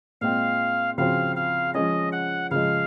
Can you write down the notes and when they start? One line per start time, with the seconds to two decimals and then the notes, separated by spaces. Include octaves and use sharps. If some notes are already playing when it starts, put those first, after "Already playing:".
0.21 A#2 G#3 C4 F5
0.98 C#3 F3 C4 F#4 C5 F5
1.36 F5
1.74 F3 G#3 C#4 D#5
2.12 F#5
2.51 C#3 F3 G#3 F5